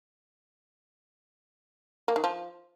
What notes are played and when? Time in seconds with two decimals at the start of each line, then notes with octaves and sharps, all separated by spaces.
2.08 A#3
2.16 D#3
2.24 F3